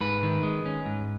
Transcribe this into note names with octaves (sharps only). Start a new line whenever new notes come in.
G#2 B4
D#3
G#3
C#4
G#2